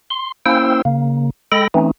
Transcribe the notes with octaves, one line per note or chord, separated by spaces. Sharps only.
C6
A#3 C#4 E4 C5 G5 E6
C#3 A#3
G#3 A4 G5 B5 A#6
E3 A3 C4 C#4 D#4